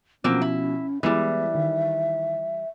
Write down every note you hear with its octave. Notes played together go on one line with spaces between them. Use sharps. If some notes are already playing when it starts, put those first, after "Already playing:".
B2 F3 F#3 A#3 C4 C#4
E4
E3 G3 G#3 B3 E4 E5
D#3